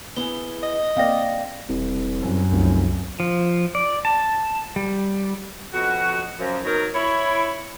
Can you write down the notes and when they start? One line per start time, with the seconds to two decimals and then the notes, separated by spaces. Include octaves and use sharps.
0.16 B3 E4 G#4 G7
0.63 D#5
0.97 A#3 C4 D5 F5 G5 A#6
1.69 E1 C2
2.20 F#2
2.52 F1 C2
3.20 F3
3.75 D5
4.05 A5
4.76 G3
5.73 F2 B2 F#4
6.38 F#2 F3
6.64 B2 F#3 D#4 A#4
6.94 E4 C#5